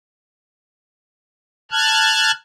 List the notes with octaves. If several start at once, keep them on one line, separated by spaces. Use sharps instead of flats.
A5 F6 F#6 G#6